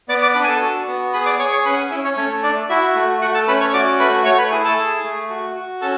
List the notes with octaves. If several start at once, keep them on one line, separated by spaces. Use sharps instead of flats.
B3 D5 D6
D5 D6
D4 B4 B5
G#5
A4 A5
F#4
B3
G#4 B4 B5
D5 D6
G#4 C#5 C#6
C#5 C#6
C#4 B4 B5
F#5
G#4 G#5
C#4 E4 E5
C#4 C#5
A3 C#4 C#5
D4 D5
E4 F#4 E5
A3
A3 F#4 F#5
A4 A5
C#4 B4 B5
C#5 C#6
F#4 D5 D6
A3 B4 B5
A3 C#5 C#6
B4 B5
E4 G#4 G#5
A4 A5
G#4
A3
F#4
F#4
C#4 A4 A5